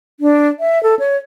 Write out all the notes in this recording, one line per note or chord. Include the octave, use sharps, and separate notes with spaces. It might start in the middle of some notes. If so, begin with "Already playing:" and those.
D4
E5
A4
C#5